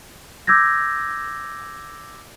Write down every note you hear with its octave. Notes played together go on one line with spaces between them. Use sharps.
D6 E6 G6 G#6 A#6